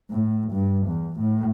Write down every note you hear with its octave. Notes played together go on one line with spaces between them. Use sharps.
A2
G2
E2
A2